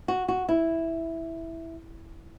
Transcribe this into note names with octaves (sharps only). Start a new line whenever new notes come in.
F#4
F#4
E4